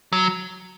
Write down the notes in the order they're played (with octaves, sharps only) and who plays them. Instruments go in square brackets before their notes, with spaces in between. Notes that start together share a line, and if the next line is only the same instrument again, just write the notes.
[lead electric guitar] F#3